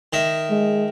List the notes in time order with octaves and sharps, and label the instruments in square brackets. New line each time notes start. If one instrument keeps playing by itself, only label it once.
[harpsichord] D#3 D#5 E5
[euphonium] G#3